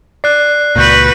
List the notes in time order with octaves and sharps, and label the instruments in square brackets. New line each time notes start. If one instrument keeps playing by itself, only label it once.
[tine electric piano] D5 [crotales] F#6 C7
[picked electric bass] C#2 A#2 [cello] F#4 B4 [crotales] F#6 G6